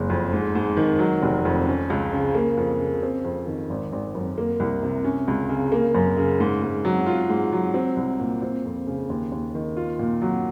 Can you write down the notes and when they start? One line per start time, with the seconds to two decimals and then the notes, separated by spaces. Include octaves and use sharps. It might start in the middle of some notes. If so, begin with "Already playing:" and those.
Already playing: F#1 G#3
0.10 F2
0.33 G#2
0.55 G#2
0.77 D#3
0.99 F#3
1.22 F1
1.45 F2
1.67 C#4
1.90 C#2
2.12 C#3
2.35 A#3
2.57 F2
2.80 C#3
3.03 C4
3.24 F2
3.47 D#3
3.70 G#1
3.92 G#1
4.15 F#2
4.38 A#3
4.60 C2
4.83 C3
5.04 C#4
5.28 C#2
5.49 C#3
5.72 A#3
5.95 F#2
6.17 C#3
6.40 G#2
6.63 G#2
6.85 F#3
7.06 F4
7.29 G#2
7.53 F#3
7.74 C4
7.97 C2
8.19 A#2
8.42 C4
8.65 F2
8.87 C#3
9.10 D#2
9.32 D#2
9.55 D#3
9.77 F4
9.99 A#2
10.22 F#3